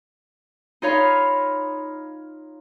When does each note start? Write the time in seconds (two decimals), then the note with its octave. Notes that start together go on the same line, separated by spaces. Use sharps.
0.82 D#4 F4 C#5 F5 B5